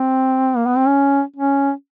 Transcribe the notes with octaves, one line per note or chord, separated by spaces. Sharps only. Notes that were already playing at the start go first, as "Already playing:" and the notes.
Already playing: C4
A#3
B3
C4
C#4
C#4